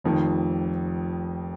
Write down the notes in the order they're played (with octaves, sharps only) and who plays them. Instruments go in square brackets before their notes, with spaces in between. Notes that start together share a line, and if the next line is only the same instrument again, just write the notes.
[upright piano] F1 F2 D#3